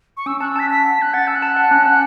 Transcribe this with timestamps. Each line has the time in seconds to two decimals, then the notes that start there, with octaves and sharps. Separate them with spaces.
0.17 C#6
0.26 C#4 E6
0.41 A5 F#6
0.48 E6
0.56 A5 B6
0.70 A5 B6
0.85 F#5
0.99 C#4 F#6
1.14 F#5 A6
1.27 A5 E6
1.35 F#6
1.42 A5
1.56 F#5
1.71 C#4
1.86 F#5